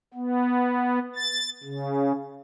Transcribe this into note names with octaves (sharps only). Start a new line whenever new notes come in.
B3
A6
C#3